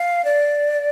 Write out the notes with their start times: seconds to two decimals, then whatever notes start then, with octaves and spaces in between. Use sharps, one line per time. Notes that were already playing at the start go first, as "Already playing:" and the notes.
Already playing: F5
0.25 D5